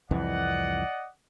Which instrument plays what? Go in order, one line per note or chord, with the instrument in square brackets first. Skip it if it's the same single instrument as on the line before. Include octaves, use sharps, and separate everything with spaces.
[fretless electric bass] C2 F2 E3 [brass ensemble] D5 D#5 F#5